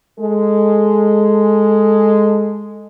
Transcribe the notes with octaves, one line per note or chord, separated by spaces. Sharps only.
G#3 A4